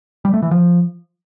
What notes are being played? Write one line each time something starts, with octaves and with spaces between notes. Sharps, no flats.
G3
A3
E3
F3